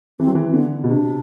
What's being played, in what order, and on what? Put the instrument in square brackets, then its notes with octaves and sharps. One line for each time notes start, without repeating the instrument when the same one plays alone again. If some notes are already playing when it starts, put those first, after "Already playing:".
[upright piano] E3 [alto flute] C4
[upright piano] F#3
E3
[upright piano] D3 [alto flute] B3
[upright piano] B2
[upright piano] C3 [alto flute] D4